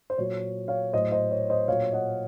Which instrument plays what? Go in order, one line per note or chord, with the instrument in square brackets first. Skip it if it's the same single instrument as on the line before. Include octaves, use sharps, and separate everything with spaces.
[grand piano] C5
A#2 F#3 C#5
C#5 F5
A2 F#3 C5 D#5
C5 D#5
C#5
C5 D#5
A#2 F#3 C#5 F5
D#5 F#5